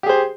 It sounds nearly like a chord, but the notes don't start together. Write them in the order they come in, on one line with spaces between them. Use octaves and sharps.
G4 G#4 C5